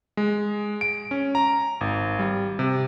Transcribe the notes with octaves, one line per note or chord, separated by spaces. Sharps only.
G#3
D7
C#4
A#5
G#1
G3
C3